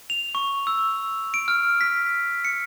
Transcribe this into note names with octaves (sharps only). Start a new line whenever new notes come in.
F7
C#6
E6
D7
F6
B6
C#7